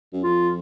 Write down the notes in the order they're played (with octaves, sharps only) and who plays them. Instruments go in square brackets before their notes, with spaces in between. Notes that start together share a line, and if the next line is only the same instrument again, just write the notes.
[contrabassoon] F#2
[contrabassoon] F2 [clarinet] F4